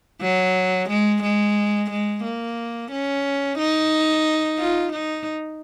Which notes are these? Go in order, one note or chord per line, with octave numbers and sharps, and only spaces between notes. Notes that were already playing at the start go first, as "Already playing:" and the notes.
F#3
G#3
G#3
G#3
A#3
C#4
D#4
F4
D#4